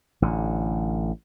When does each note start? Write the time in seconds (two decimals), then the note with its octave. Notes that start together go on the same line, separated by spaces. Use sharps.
0.22 A1 D3